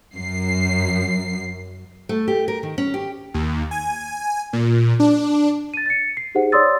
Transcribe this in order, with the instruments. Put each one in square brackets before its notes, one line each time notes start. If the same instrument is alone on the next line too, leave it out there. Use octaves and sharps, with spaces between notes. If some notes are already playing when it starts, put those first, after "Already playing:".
[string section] F#2 C7
[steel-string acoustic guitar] A3
G4
A#4
D#3
C#4
G4
[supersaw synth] D#2
G#5
A#2
D4
[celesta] A6 D#7
A6 C#7
C7
D#4 G4 G#4 C5 F#5
C#5 D5 C6 D#6 E6 A6